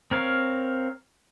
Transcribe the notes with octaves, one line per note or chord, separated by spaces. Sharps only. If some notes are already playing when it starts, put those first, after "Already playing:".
C4 A#4 C#5 F5